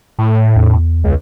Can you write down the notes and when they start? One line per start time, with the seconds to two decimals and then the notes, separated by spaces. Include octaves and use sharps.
0.19 A2
0.56 E2
1.04 C#2